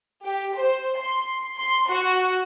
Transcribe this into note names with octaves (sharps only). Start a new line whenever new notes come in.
G4
C5
C6
C6
F#4